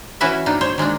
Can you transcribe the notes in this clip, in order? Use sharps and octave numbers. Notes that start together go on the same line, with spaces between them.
E3 C#4 E4 F#4 B4 E5
A#3 D4 D#4
C5 C#5
D#3 G#3 A#3 D4